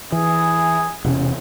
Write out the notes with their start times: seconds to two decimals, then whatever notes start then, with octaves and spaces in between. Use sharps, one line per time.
0.12 E3 G#4
1.04 E1 C3 C#4